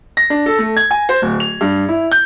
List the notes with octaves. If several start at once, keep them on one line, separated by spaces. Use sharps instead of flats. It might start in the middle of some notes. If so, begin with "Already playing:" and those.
A#6
D4
A4
A3
G#6
G#5
C5
D1
F7
G2
E4
G6